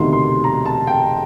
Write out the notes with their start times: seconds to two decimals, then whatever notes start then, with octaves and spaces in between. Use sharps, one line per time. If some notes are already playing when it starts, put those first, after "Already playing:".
Already playing: E1 D2 C3 D#3 C6
0.13 C6
0.44 A#5
0.65 A5
0.87 G5